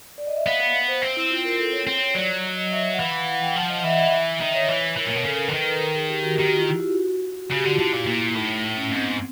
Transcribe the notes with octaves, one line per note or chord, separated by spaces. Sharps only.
D5
D#5
E5
B3 F5
F5
C5
C4
E4
F4
A#4
A4
C#5
C4
F#3 D5
D#5
D#5
E5
F#5
E3 F5
G5
F3 F#5
D#5
E3 E5
E5
D#3 D#5
C#5
E3
E3 A#4
A#2
B2
C#3 A4
A#4
D3 B4
D#3 A#4
B4
A#4
G#4
G4
F#4
D#3 G4
F#4
F4
E4
F#4
C#3
G4
D3 F#4
F4
D3 E4
A#2
A#2
A2 D#4
C#4
G#2 C4
B3
C4